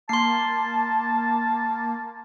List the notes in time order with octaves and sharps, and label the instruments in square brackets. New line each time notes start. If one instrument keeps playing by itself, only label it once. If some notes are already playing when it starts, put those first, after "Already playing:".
[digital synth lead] A#3 [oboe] A5 [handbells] C6 C7